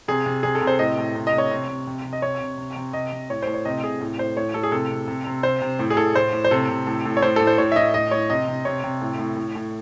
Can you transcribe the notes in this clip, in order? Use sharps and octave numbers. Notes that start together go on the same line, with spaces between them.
C3 G#4
C3
C3 G#4
A4
C3
C5
A2 D#5
A2
C3
D#5
C3
C#5
C3
C3
C3
C3
D#5
C3 C#5
C3
C3
C3
C3 D#5
C3
A2 C#5
A2 C5
C#5
C3 D#5
C3 G#4
A2
A2 C5
A2 C#5
A2 A4
G#4
C3 A4
C3
C3
C3
C3 C5
C3
A2
G#4
A2 A4
A2 C5
A2
C5
C3 A4
C3
A2
A2
C#5
A2 C5
A2 A4
C5
A2 C#5
E5
A2 D#5
A2 D#5
A2 C#5
C3 D#5
C3
C3 C#5
C3
A2
A2
A2
A2